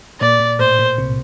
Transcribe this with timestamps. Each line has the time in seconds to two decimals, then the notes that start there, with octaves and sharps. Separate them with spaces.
0.21 A#2 D5
0.40 A#2
0.59 A2 C5
0.79 A#2
0.98 C2 C3